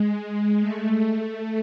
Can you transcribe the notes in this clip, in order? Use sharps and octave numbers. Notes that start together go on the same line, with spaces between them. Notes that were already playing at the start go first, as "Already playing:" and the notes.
Already playing: G#3
A3